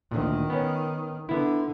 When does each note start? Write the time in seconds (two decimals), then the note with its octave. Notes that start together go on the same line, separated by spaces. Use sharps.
0.11 D2 A#2 D#3
0.50 B3 C#4
1.29 D3 B3 E4